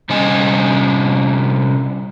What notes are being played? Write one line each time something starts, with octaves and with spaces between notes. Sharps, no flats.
C3 G3 C#4 D#5 G#5